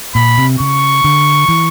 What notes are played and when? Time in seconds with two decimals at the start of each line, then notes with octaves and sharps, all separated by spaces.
0.15 A#2 B5
0.37 C3
0.60 C#3 C#6
1.04 D3
1.48 E3